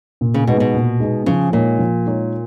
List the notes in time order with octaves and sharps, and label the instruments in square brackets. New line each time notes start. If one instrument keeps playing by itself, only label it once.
[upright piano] A#2
[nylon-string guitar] C#3
[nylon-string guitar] B2 [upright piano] G#3 B3 D#4 G#4
[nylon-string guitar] B2
[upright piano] A#2
G#3 B3 D#4 G#4
[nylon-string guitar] C#3 [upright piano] F3
[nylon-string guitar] A#2 [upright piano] G#3 D#4 A#4 C#5
[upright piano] F3
G#3 D#4 A#4 C#5